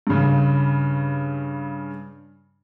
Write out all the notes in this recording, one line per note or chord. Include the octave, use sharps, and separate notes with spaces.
G2 C#3